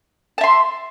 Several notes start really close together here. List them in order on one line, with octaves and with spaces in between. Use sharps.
A5 E5 C6